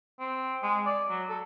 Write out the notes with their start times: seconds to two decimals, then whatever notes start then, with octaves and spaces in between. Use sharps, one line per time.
0.20 C4
0.63 G#3
0.86 D5
1.10 F#3
1.29 A4